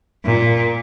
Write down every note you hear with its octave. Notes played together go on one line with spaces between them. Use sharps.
A#2